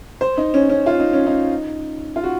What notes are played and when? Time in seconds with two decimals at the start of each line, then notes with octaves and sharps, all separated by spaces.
0.21 C5
0.37 D#4
0.54 C#4
0.70 C#4
0.86 F4
1.00 D#4
1.13 C#4
1.27 D#4
2.16 F4
2.24 F#4